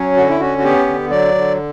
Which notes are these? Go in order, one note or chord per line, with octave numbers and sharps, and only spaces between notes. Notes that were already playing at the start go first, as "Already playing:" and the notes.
Already playing: F#3 C#4
D3 F#4
E4
C#4 F#4
F#4
B3 G4
D3
F#3 D5
D3